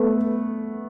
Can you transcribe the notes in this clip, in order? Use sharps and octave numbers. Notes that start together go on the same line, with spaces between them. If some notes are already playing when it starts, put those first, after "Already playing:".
Already playing: A3 B3